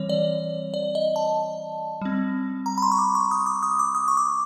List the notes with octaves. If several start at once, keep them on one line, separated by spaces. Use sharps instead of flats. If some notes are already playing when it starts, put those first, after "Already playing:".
Already playing: E3 G3 C4 C#5
D5
D5
D#5
A5
G3 C4
A#5
B5
C6
C#6
D6
C#6
D#6
D6
D#6
D6
D#6
C#6
D6